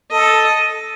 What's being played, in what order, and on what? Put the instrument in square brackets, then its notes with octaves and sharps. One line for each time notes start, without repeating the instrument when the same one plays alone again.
[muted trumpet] A4 [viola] D#5